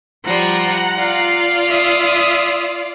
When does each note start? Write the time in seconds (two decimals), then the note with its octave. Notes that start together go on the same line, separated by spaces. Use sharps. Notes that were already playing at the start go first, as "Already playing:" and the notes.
0.24 F3 G3 F4 F#5 A#5
0.96 F4 D5 F5
1.69 E5 D#6